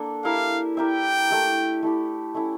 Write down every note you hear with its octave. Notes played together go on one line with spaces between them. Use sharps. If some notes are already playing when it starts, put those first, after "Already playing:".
Already playing: A#3 D4 A4
E4 G4 A#4 E5 F5
E4 G4 A#4 E5 G5
A3 E4 G4
A3 E4 G4
A3 C#4 E4